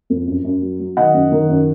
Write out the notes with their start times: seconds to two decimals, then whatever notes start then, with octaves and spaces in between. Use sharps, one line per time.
0.10 F2
0.27 F#2
0.44 F#2
0.62 F#3
0.80 F#3
0.97 D#3 D#5 F#5
1.14 F#2
1.31 D#3
1.49 F#2